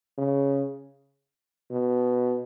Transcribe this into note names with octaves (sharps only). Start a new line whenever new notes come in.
C#3
B2